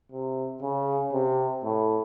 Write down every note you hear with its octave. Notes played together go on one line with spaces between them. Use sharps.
C3
C#3
C3
A2